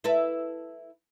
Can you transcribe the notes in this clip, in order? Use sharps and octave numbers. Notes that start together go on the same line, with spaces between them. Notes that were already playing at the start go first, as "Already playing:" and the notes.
E4 A4 B4